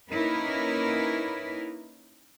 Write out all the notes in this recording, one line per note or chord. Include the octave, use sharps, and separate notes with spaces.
A#3 C#4 D#4 E4 A#4 B4